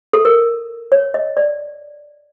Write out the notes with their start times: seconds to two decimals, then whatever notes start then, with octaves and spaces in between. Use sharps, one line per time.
0.13 A4
0.25 A#4
0.92 C#5
1.14 D#5
1.37 D5